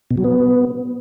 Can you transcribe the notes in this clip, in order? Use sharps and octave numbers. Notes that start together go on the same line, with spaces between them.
B2
F#3
B3